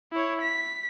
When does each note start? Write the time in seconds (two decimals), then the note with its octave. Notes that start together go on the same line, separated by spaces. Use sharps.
0.12 E4 C#5
0.42 B6